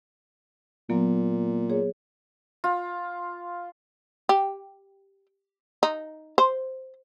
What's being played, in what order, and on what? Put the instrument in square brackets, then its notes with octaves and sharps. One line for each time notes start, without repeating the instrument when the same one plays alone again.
[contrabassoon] A#2 [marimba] F#3 A#3 B3
[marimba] G#4 C#5
[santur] F4
[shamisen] G4
D#4
C5